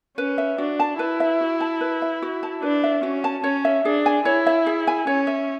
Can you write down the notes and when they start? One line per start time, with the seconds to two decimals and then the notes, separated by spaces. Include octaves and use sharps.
0.17 C#4 B4
0.38 E5
0.58 D4 F#4
0.80 A5
0.99 E4 B4
1.20 E5
1.41 F#4
1.61 A5
1.81 B4
2.02 E5
2.22 F#4
2.43 A5
2.62 D4 B4
2.84 E5
3.03 C#4 F#4
3.24 A5
3.44 C#4 C#5
3.65 E5
3.85 D4 G#4
4.06 G#5
4.25 E4 C#5
4.47 E5
4.66 G#4
4.87 G#5
5.07 C#4 C#5
5.27 E5